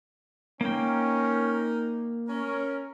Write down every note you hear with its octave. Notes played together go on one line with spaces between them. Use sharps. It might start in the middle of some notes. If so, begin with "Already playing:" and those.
A#3 C#4 D#4 A#4 G5
C#4 A#4